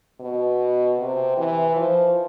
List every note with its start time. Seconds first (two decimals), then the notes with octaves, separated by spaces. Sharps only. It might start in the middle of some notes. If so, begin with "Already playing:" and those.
0.20 B2
0.98 C3
1.37 E3
1.76 F3